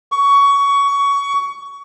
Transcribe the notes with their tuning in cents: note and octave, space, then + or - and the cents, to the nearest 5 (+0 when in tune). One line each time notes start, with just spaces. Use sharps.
C#6 +20